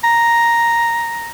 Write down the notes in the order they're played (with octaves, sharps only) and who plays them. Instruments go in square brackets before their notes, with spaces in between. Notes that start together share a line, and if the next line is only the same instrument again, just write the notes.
[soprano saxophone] A#5